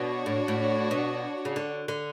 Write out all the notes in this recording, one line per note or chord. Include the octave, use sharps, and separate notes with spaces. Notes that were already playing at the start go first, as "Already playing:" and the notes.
Already playing: B2 D4 F#4 C#5
A2
A2
B2
C#3
D3
D3